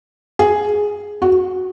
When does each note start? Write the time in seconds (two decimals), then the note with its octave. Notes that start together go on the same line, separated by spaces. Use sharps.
0.39 G#4
1.22 F#4